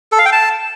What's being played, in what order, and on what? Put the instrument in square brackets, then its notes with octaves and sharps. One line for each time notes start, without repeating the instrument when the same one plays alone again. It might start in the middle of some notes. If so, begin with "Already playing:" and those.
[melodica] A4
F5
G5
A5